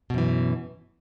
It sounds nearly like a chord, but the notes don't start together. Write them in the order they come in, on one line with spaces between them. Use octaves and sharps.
B2 F#2 E3